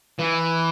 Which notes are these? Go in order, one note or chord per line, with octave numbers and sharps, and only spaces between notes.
E3